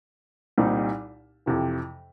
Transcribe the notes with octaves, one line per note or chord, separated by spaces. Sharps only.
C2 A#2 G3 C4 D#4
F2 C3 E3